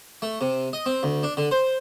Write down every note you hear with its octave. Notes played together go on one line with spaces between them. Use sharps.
A3
C3
D#5
C4
D2
D4
D3
C5